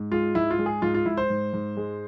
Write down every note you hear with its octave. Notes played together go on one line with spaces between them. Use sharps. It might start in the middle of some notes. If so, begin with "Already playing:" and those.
Already playing: G#2
G#3 F4
G#2 E4
F4
G#3
G#4
G#2 F4
F4
G#2 E4
C5
G#2
G#2
G#3